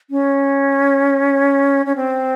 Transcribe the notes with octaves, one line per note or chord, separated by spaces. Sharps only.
C#4
C#4
C4